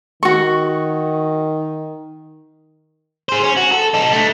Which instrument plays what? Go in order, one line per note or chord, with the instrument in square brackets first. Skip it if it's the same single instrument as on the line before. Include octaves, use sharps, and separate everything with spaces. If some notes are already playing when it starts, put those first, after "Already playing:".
[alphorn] D#3 [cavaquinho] F#4 C#6
[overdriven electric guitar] G#4 C5
C#4
F#4
A4
D#4 A4
D3 A3